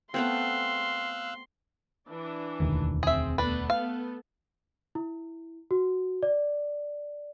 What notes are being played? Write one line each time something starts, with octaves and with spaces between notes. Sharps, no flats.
A3 B3 C4 F5 C6 E6 F#6
E3 D4
E1 D2 D#3
C4 G#4 E5
A3 B3 D4 A4 B4
F5
E4
F#4
D5